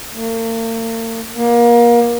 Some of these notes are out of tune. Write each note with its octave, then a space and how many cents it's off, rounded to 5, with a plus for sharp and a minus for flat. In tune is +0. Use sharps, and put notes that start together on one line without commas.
A#3 -45
A#3 +30